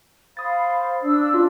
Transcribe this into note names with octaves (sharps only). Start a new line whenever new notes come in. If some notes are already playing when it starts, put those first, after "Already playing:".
C5 F5 B5 D#6 A6
D4 E6
C#4 F4 D5